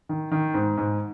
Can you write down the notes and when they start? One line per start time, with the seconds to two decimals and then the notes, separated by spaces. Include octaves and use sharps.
0.09 D#3
0.31 D#3
0.54 G#2
0.77 G#2